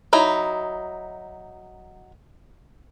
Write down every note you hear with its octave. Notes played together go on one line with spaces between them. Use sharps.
F#3 D#4 E4